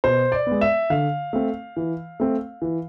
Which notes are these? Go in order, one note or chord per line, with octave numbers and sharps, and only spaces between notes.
B2 C5
D5
B3
G#3
E5
D3 F5
A3 C4
E3
A3 C4
E3